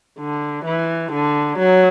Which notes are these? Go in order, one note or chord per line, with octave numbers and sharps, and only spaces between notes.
D3
E3
D3
F#3